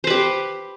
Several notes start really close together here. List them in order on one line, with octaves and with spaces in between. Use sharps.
C5 B4 G4